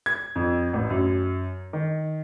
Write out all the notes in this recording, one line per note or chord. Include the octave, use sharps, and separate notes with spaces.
G#6
F2
A1
F#2
D#3